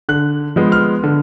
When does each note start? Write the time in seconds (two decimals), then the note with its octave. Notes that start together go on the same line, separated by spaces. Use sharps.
0.09 D3 F#6
0.56 F3 G#3 B3
0.72 F6
1.03 D3